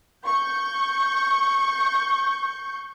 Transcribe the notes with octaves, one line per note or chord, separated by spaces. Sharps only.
C#6 G6